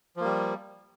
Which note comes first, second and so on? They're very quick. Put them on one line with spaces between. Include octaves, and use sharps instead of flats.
F3 A#3 G3